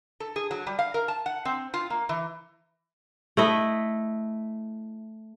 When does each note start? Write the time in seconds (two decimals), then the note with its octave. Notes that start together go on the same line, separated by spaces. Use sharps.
0.20 A4
0.36 G#4
0.51 F#3
0.67 G3
0.79 F5
0.94 A#4
1.08 A5
1.26 F#5
1.45 C4
1.74 F4
1.90 A#3
2.09 E3
3.37 A3 E4 D#5